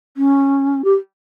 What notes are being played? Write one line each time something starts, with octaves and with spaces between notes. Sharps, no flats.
C#4
G4